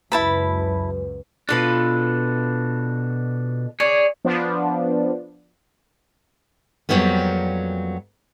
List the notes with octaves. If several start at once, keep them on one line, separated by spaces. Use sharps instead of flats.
C#2 F#2 E4 B4 A5 B5
B2 D4 F4 A4 B4
G#4 C#5 D5
F3 B3 D4
F2 G#2 F#3 G3 A#3 B3